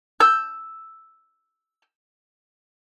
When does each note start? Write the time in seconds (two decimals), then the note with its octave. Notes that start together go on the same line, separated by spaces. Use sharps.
0.20 E6 G6